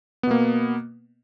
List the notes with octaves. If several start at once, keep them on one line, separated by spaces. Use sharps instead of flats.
B2 A#3 B3